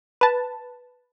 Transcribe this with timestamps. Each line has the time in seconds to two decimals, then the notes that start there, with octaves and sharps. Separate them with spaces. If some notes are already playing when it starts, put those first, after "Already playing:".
0.21 B4 A5